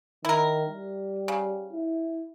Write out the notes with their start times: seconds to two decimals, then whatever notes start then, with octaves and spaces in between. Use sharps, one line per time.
0.25 D#3 E4 A#4
0.69 G3
1.28 C#3
1.73 E4